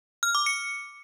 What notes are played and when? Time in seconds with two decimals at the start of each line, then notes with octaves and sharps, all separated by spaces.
0.23 F6
0.35 D6
0.46 C#7